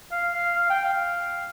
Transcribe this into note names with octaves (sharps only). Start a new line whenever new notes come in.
F5
F5
F5
G5
F5